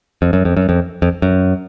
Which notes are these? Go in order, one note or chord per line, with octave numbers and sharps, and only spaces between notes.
F2
F#2
F2
F#2
F2
F2
F#2